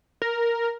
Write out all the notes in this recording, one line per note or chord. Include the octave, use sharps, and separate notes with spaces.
A#4